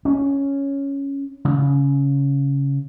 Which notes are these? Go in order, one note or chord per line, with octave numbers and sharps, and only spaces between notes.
C#4
C#3